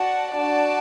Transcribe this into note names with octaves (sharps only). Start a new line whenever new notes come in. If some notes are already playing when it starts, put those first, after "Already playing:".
Already playing: F#4 D5 F#5 A5
D4 F#4 D5 A5